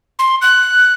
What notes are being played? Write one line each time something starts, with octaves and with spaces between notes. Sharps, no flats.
C6
F#6